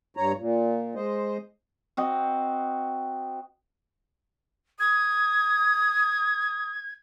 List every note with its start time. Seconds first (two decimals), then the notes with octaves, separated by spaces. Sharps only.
0.17 G2 C#5 A#5
0.38 A#2
0.95 G#3 C5 D#5
1.97 C4 F#4 D#5
4.80 D#6 G#6